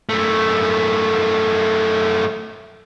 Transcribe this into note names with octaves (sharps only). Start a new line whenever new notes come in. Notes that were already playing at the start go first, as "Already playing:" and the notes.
F#2 A3